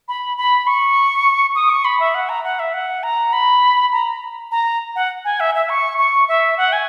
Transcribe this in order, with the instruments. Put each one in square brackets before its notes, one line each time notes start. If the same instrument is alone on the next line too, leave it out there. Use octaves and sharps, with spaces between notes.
[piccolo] B5
B5
C#6
D#6
C#6
B5
E5
F#5
A#5
F#5
E5
F#5
A#5
B5
A#5
A#5
F#5
G#5
E5
E5
C#6
C#6
E5
F#5
G#5